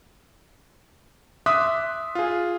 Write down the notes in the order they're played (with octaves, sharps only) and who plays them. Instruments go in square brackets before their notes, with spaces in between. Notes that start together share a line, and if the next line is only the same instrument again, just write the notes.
[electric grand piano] E5 C6 D6 D#6 F#6 B6
F4 G#4